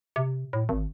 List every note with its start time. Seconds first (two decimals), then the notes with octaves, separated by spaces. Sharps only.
0.16 C3
0.53 A2
0.69 G#1